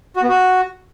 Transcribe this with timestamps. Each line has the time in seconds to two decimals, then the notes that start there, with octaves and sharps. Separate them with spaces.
0.16 F#4
0.22 B3
0.29 F#4